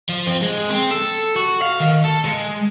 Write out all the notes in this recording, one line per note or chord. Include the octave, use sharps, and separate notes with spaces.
F3
C4
G#3
C4
A4
F#4
F5
D#3
A4
G#3